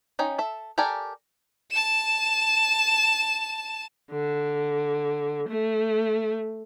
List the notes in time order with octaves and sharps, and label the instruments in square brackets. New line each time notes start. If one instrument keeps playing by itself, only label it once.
[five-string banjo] C#4 D#4 G5
A4 E5
G4 A4 A#4 D5 G#5
[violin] A5 E7
[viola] D3
A3